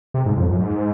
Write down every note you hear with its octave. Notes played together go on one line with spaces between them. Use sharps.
C3
G#2
F2
F#2
G#2